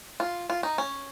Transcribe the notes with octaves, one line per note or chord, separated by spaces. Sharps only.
F4
F4
D#4
C#4